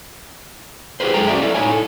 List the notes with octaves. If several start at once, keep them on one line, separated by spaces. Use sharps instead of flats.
E4 G4 G#4 B4 C5
F#2 G#3 G#4 A4 G5 A#5
A3 C#4 F#4 D5 E5
E4 A4 D5
A2 D#4 E4 C#5 G#5
A4